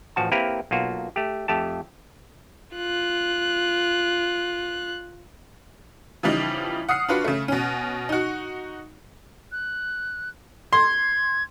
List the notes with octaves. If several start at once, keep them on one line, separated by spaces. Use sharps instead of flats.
A1 F3 F#4 A5
A#3 C4 E4 G4 A#4 B4
B1 A#3 F4 F#4
A3 G4
F2 A3 G4 A5
F4 F#6
C#3 E3 F3 G3 D#4
F#5 D#6 F6 C7
D4 F4 F#4 B4
C#3 A3
B2 C#4
D#4 F#4
F#6
C6 G#6